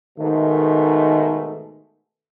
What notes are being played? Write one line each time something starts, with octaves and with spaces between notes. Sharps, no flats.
G#2 B2 D#3 A3